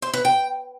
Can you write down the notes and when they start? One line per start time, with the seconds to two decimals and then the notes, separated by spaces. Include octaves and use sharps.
0.02 C5
0.14 B4
0.25 G5